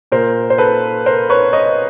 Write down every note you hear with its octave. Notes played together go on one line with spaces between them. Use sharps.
A#2 A#4 C5
C5
A4 B4
A#4 C5
B4 C#5
C#5 D#5